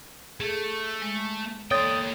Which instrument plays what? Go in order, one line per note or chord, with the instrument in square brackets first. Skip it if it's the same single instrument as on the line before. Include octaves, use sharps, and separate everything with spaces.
[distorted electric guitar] A3 [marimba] G#4 A4
[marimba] G#3
[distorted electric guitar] A#3 G5 [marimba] A4 D5 C6 [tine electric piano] C#5 D#6 A6